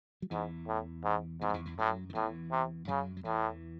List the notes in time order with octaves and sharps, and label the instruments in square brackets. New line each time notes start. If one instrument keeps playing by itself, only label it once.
[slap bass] F#3
[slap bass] E2 E3 [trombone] G#2
[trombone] A2
G#2
[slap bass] E2 E3 [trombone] G#2
[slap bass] F#3
E2 E3
E2 E3
[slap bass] F#2 F#3 [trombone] A2
[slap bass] D#3
[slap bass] E2 E3 [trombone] A2
[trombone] C3
[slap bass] F#2 F#3 [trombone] C#3
[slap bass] F#3
[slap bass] E2 E3 [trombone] A2